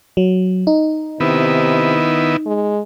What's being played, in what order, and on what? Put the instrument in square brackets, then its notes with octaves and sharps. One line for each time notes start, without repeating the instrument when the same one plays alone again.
[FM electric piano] F#3
D#4
[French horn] C3 [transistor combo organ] D#3 B3 E4
[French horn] G#3